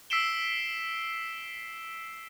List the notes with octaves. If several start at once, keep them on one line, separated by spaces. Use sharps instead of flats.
E6 B6 C7 D7 E7 G7